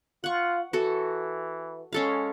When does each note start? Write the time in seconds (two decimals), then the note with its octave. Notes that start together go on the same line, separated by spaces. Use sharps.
0.24 F4 F#5 C#6
0.73 E3 F#4 A4
1.93 G#3 C#4 A4 F5